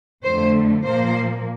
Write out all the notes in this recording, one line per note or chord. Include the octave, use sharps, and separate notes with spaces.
F2 D3 A3 C5
A#2 F3 A#3 C5